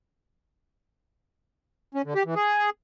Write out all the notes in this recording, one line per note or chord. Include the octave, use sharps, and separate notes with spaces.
C#4
D3
G4
E3
G#4